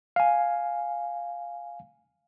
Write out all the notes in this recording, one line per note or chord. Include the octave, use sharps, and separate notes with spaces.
F5 G#5